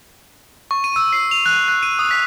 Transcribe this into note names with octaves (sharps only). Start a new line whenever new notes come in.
C#6
D#7
E6
C7
F7
F#6
F#6
D#7
D#6
B6